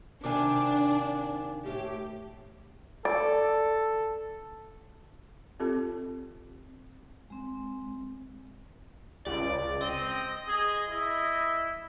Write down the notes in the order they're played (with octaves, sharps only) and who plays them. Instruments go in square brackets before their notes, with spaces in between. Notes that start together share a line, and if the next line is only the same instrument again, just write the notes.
[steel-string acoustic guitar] C3 D#3 F5 [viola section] D4 [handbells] G#5 D6
[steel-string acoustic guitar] A2 [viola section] G4
[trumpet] A4 [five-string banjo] D5
[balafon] C4 F4 G4 A4
[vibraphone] G#3 C4
[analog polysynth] C#2 D5
[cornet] C4 [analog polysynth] D#5
[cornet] G#4
E4